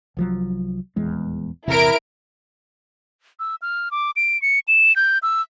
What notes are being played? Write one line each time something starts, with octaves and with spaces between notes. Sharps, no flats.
C2 F3 F#3
D#1 E2 G#3
A#1 E2 C3 E4 A#4 D7
E6
F6
D6
D7
C#7
E7
G6
E6